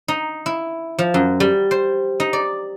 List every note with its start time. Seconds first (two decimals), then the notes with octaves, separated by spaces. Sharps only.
0.08 D#4
0.46 E4
0.99 F3
1.14 F#2
1.40 G3
1.71 C5
2.20 D#4
2.33 D5